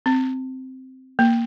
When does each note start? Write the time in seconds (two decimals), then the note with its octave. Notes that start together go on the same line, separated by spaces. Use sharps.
0.06 C4
1.19 A#3